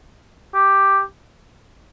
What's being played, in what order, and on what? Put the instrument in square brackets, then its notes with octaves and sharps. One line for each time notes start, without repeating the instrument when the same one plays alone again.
[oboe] G4